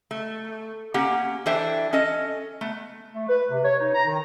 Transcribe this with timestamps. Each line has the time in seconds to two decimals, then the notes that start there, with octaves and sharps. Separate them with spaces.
0.11 A3
0.94 A#3 C#4 G4 F#5
1.46 E3 D4 A4 C5 E5 G5
1.93 C#4 A4 D#5
2.61 A3 B3
3.14 A3
3.28 B4
3.51 C3
3.64 C#5
3.78 D#4
3.94 A#5
4.07 D#3